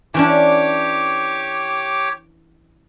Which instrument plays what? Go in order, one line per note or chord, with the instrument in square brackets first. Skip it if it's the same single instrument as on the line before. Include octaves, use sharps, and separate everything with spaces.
[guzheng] E3 C#4 D4 [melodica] G4 C#5 D6